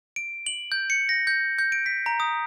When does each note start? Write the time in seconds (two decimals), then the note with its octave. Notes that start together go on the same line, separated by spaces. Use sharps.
0.16 D7
0.46 F#7
0.72 G6
0.90 C#7
1.09 A#6
1.27 G6
1.58 G6
1.72 D7
1.86 B6
2.06 A#5
2.20 D#6